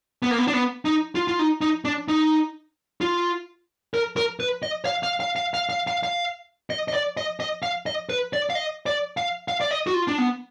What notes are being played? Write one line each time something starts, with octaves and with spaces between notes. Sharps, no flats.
B3
A#3
B3
D4
B3
D#4
F4
F4
D#4
D#4
D4
D#4
F4
A#4
A#4
B4
D#5
F5
F5
F5
F5
F5
F5
F5
F5
D#5
D#5
D5
D#5
D#5
F5
D#5
B4
D5
F5
D#5
D5
F5
F5
D5
D#5
F#4
F4
D4
B3